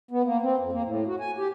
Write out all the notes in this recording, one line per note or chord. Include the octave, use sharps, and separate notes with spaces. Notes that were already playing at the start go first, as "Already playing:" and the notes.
B3
A#3
C4
F2
A#3
A2
F#4
G#5
G4